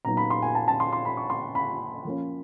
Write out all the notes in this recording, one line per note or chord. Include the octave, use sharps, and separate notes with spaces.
A#2 F#3 B3 D#4 A#5
B5
C6
G#5
A5
A5
C6
C6
B5
C#6
C6
B5
F3 A#3 C#4